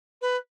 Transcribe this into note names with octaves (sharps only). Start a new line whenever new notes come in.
B4